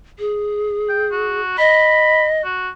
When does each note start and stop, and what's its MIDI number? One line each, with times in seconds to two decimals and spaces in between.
0.19 1.41 68
0.89 1.06 79
1.12 1.55 66
1.58 2.42 75
1.58 2.26 83
2.44 2.69 66